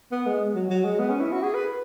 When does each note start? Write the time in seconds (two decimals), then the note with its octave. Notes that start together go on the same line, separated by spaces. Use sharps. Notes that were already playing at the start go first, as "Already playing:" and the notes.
0.12 B3
0.26 G#3
0.55 F#3
0.70 F#3
0.85 G#3
0.99 B3
1.10 C#4
1.20 E4
1.32 F#4
1.43 G#4
1.54 B4